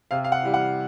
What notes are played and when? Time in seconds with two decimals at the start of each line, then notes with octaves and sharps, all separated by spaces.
0.11 C3 F5
0.24 F5
0.32 F#5
0.43 E3 G3
0.54 F#5